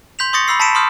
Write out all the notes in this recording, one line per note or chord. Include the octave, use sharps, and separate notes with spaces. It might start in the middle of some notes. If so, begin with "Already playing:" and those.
C6 G6 B6 F7
C6 C#6 D#6 A6 A#6 C#7
B5 C6 E6 C7
A5 B5 B6 C#7 D7 E7
C6 C#6 D#6 F6 G6